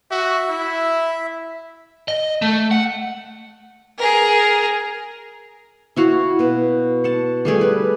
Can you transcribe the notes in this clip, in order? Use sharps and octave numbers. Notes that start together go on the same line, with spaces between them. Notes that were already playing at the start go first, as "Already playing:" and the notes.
F#4 E5
E4
D#5
A3
F#5
G#4 A#4
E4 F#4 F5
B2 B4
F#5 A5
G3 A3 G#4 D5
B4